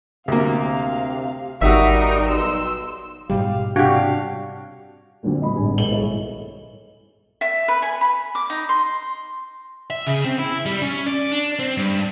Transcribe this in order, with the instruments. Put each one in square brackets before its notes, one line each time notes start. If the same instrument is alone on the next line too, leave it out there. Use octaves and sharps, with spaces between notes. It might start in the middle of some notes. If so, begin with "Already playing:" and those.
[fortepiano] D2 A#3 [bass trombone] C3 [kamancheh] F5
[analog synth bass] G#1 [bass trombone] G3 [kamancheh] D#4 A#4 [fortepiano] F#4 E5
[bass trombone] B1 [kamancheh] C6 E6
[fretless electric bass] G#2 B2 G3 [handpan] G4 [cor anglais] F5
[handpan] C3 D4 [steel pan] F#4 G4 [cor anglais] F5
[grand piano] D2 A#2 D3 F#3 C4
D#5 B5
D1 G#1 D2 G2 G#5
B1 G#2 D#3 A#3 F#7 G7
D#4 E4 G#4 A4 C#5 D#5
[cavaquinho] E5
B4
G#5
B5
D6
D#4
C6
[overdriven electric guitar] E5
C#3
C4
E4
G3
C#4
D5
D4
C4
G2